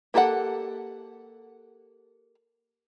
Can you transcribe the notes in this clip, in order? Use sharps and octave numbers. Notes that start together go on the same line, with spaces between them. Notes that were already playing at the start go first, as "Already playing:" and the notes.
A#3 G4 A4 B4 F#5